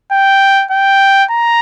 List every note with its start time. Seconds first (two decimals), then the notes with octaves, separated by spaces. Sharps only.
0.12 G5
0.71 G5
1.31 A#5